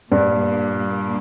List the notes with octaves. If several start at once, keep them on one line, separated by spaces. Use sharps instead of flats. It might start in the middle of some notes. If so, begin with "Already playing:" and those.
G2 A#2 G3 A#3